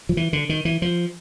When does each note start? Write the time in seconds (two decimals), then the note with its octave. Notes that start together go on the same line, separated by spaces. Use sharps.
0.09 F3
0.17 E3
0.33 D3
0.49 D#3
0.65 E3
0.82 F3